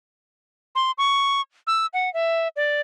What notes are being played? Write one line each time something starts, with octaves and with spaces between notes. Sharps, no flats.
C6
C#6
E6
F#5
E5
D5